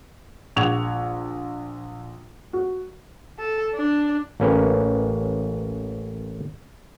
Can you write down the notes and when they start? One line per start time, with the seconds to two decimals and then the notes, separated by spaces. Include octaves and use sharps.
0.56 A#1 F#5 C#6 G#6 F7
2.53 F#4
3.39 A4
3.75 D4
4.40 A1 A#3 C#4 B4